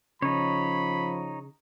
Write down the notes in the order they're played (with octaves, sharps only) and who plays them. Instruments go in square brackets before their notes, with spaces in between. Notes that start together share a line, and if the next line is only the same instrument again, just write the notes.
[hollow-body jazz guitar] C#3 [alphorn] F3 [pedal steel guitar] D#4 C#5 [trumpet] B5